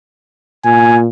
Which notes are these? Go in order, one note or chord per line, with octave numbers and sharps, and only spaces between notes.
A#2 G#5